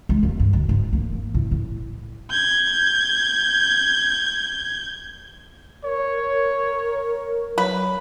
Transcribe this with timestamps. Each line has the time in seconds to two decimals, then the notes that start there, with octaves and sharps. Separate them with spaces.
0.09 G#3
0.23 D#2
0.40 G2
0.53 D2
0.69 G#2
0.93 A#3
1.13 A#3
1.34 A2
1.51 A2
2.31 G6 G#6
5.85 A#4 C#5
7.58 F#3 B4